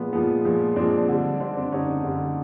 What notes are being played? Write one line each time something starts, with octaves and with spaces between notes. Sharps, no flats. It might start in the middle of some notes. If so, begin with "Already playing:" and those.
Already playing: A#2 F3 G#3 B3
A#2 F3 G#3 B3
A#2 F3 G#3
A#2 F3 G#3 C4 D4
D3 G3
D3 G3 C4 D4
C4 D4
D3 G3 C#4 D#4
D3 G3